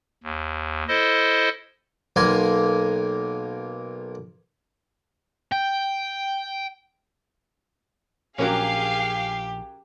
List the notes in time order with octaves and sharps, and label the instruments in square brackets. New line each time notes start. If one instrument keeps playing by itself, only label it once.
[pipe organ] D#2
E4 A4 C5 D#5
[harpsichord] B1 A#3 G#5 C6
[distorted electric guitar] G5
[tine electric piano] A#1 [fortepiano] F#3 A#3 C#4 [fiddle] G4 [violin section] G#4 F5 C7